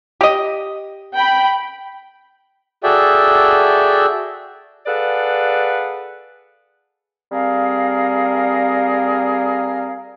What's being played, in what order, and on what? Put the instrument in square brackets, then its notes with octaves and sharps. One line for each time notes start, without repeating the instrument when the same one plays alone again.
[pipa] G4 D#5
[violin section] G5 B5
[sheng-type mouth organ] F#4 G#4 A4 D5 E5 G5
[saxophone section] G#4 A4 B4 D5 F5 F#5
[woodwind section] G3 C4 G#4 A#4 F5